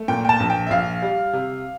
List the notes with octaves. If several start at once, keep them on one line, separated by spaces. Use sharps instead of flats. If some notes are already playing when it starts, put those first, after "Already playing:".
Already playing: A3
A#2 G5
G5
A5
A#1
G5
E5
A#1 F5
G3
C3